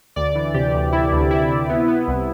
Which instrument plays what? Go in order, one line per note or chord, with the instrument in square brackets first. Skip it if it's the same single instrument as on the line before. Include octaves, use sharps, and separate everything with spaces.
[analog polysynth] D2 D5
E3
C3 G4
D2
D2 E4
D2
D2 E4
C3
B3
B3
C2